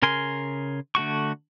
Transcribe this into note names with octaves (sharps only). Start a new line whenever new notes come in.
C#3 A#4 G#5 C6
D3 A3 F#4 C#6